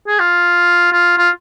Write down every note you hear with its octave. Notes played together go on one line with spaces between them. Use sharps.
G#4
F4
F4
F4